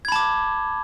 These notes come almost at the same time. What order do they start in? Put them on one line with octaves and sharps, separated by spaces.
G#6 B5 A5 D6